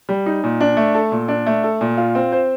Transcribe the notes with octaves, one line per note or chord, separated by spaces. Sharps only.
G3
D#4
A#2
D4
A3
A4
A#2
D4
A3
A4
A#2
F4
C4
C5